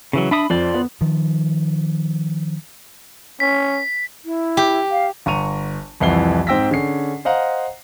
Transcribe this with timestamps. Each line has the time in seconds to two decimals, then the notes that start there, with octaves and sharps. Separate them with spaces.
0.13 C#3 E3 F#3
0.31 D4 E5 B5 D#6
0.50 F2 F4 C5 D5
0.74 B3
1.01 D#3 F3
3.40 C#4 B6
4.25 E4
4.57 G4
4.91 F5
5.26 G1 A#5 C#6 D#7 F7
6.00 C2 F2 E3 F#5 C7 G7
6.47 G#2 C4 G5 E6 A#6 B6
6.71 D3 C#4 G#4 C7
7.25 C5 D#5 F5 F#5 A#5